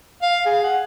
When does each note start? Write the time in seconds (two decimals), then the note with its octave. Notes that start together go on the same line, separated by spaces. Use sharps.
0.23 F5
0.46 G#4
0.64 F#5